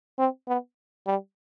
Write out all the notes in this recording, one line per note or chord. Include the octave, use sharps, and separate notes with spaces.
C4
B3
G3